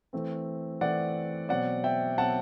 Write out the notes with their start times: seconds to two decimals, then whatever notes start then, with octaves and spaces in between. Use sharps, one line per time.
0.13 E3 A3 C4
0.81 E3 A3 C4 D5 F#5
1.49 B2 F#3 C4 D5 F#5
1.84 E5 G5
2.18 B2 F#3 C4 F#5 A5